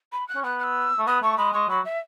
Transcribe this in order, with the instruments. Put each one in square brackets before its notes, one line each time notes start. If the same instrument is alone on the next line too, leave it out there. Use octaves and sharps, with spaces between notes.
[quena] B5
F#6
[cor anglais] C#4
[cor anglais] B3 [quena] F#6
[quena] F#6
E6
[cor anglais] A3
[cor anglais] B3 [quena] D#6
[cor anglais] A3 [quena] C#6
[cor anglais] G#3 [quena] B5
[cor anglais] G#3 [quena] C#6
[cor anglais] F#3 [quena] B5
[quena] E5